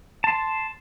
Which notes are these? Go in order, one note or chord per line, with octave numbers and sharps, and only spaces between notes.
A5 C6